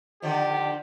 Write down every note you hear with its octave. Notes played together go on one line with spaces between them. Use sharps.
D3 D#3 F3 G4